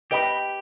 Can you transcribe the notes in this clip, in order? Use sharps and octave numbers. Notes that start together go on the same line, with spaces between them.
G4 B4 D#5 G5 B5